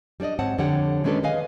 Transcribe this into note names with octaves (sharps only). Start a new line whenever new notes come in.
G3 D4 C5 D5 D#5
G#2 C4 C#5 F#5 A5
F2 D3 G3 C#5 F#5 G5
D#3 G#3 C#4 D4 A4 B4
G#4 B4 D#5 F5 G#5